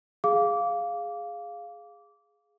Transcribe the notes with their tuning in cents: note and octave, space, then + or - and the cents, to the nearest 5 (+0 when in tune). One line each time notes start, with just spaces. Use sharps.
G#4 +0 F5 +0 D6 -20